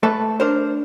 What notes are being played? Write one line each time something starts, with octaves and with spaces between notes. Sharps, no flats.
A3 A4 B4
D4 A#4 C5